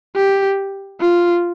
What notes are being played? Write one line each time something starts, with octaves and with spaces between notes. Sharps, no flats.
G4
F4